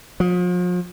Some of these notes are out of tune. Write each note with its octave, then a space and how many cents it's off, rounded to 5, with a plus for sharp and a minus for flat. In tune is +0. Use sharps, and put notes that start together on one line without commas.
F3 +40